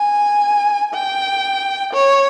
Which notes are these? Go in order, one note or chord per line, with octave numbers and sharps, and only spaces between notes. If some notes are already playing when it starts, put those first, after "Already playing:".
Already playing: G#5
G5
C#5